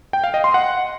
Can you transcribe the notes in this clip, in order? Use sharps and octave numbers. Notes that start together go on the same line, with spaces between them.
G5
F5
D#5
C6
F#5